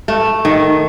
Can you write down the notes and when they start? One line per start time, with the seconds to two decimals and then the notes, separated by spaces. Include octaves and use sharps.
0.08 A3
0.45 D#3